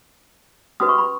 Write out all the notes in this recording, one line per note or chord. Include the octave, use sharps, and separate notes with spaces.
C#4 F#4 B4 D#6
C#6
B5